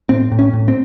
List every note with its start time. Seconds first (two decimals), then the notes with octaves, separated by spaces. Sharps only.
0.09 A2 C4
0.32 A2
0.39 C#4
0.53 A2
0.68 C4